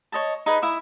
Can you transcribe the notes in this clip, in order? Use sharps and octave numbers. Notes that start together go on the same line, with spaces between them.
C#5 D#5 A5
D#4 G#4 B4
E4 E5 D#6